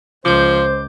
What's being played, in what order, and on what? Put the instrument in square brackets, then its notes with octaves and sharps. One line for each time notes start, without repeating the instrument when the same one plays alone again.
[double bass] C#2 [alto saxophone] F3 [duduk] C5 [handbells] D6 G6